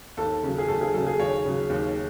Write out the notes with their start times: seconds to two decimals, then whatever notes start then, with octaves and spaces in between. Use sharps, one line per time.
0.17 D#2 A4
0.43 C#3 F#3
0.58 G#4
0.68 D#2 A4
0.81 G#4
0.94 C#3 F#3 A4
1.06 G#4
1.20 D#2 C#5
1.45 C#3 F#3
1.70 D#2